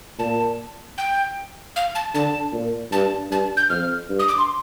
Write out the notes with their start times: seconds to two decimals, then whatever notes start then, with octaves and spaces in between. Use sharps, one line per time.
0.19 A#2 A5
0.98 G5
1.76 F5
1.95 A5
2.15 D3 A5
2.53 A#2
2.92 G2 A5
3.31 G2 A5
3.57 G6
3.70 F2 F6
4.09 G2
4.19 D#6
4.28 D6
4.38 C6